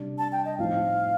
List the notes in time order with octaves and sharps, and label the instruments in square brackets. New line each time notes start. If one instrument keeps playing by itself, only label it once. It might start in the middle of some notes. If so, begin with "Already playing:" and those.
Already playing: [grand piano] C3 G3 D4
[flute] A5
G5
D#5
[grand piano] A2 F3 C4 D#4 [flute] F5